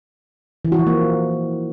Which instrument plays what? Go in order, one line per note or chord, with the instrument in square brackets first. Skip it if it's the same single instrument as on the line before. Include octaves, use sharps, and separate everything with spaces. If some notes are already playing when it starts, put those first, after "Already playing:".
[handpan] E3
F#4
F3
A#3